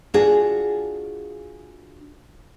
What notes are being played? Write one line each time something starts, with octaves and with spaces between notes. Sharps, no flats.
D4 F4 F#4 G#4